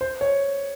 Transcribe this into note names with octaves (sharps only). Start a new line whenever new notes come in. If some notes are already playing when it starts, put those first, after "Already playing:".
C5
C#5